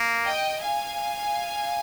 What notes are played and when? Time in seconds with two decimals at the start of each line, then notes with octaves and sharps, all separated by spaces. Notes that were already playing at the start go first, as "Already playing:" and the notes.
Already playing: A#3
0.26 D#5 G5
0.61 F5 G#5